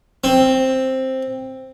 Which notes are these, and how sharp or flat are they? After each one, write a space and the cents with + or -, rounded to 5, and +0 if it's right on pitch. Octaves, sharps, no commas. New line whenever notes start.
C4 +5